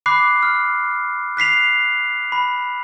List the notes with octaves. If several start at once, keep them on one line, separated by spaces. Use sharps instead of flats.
B5 D6 F#6 C7
F6
F#6 B6 C7 F7
B5